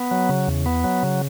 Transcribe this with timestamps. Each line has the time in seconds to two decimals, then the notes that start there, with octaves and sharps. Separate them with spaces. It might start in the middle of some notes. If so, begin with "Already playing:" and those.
Already playing: B3
0.11 F#3
0.29 C#3
0.48 E2
0.66 B3
0.84 F#3
1.03 C#3